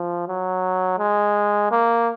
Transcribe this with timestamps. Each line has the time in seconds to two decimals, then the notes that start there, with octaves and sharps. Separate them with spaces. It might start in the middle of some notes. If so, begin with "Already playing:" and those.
Already playing: F3
0.28 F#3
0.99 G#3
1.71 A#3